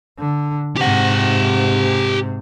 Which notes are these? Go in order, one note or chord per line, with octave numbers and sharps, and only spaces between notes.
D3
G#2 C3 G4 F#5